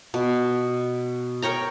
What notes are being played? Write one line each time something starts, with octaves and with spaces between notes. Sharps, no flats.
B2
A#4 C#5 G5 A#5